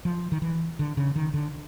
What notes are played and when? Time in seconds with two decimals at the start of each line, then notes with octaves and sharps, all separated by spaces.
0.05 F3
0.32 D#3
0.42 E3
0.79 D3
0.97 C#3
1.16 D#3
1.34 D3